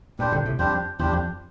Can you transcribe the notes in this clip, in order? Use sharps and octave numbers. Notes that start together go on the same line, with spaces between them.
G2 A#2 G3 D4 G4 C5
A#2 D3
A2 C3
F2 G3 D4 G4 C5
E2 G3 D4 G4 C5
F2